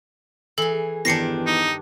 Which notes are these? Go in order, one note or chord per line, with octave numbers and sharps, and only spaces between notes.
E3 G#4 A4
E2 G2 D#3 D4 A#6 C7 C#7
D#4